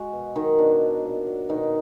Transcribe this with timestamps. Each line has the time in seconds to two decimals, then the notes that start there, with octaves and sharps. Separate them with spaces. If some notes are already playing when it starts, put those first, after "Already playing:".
Already playing: G#3 F#4
0.13 B2
0.36 D#3 F#3 D#4
0.59 B2 D4
0.81 F#3
1.04 A#2
1.27 F#3
1.49 B2 D#3 D#4